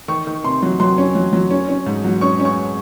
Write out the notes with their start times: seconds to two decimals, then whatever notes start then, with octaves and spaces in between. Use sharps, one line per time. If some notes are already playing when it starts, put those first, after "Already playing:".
0.08 D#3 C#6
0.27 D#3
0.44 C3 C6
0.63 F#3
0.80 F#3 C6
0.98 C#4
1.15 F#3
1.33 F#3
1.50 C#4
1.69 C#4
1.86 G#2
2.04 F#3
2.21 C#4 C#6
2.40 C#4
2.45 C#6